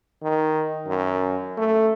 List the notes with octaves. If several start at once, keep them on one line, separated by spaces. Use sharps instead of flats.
D#3
F#2
A3